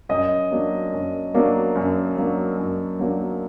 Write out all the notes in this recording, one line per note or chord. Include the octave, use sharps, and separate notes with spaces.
F#2 D#5
F#3 A#3 D4
F#2
F#3 A#3 D4
F#2
F#3 A#3 D4
F#2
F#3 A#3 D4